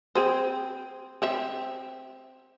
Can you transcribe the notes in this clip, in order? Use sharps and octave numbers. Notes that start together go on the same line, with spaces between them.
C4 G#4 C5
C4 C5 E5